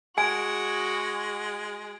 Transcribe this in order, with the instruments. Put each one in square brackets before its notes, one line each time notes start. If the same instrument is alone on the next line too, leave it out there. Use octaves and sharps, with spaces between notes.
[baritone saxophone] G#3 [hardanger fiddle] F#4 [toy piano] G#5 [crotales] G#6 D7